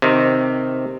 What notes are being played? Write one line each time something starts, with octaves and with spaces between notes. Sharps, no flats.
C3 D#3